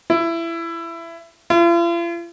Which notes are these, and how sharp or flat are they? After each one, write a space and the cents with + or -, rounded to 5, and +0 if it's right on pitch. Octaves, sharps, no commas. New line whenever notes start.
E4 +20
F4 -45